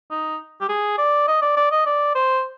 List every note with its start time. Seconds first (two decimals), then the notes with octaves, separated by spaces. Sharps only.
0.11 D#4
0.61 G4
0.69 G#4
0.98 D5
1.28 D#5
1.42 D5
1.57 D5
1.72 D#5
1.86 D5
2.15 C5